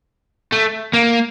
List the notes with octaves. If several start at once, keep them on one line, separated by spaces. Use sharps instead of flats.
A3
A#3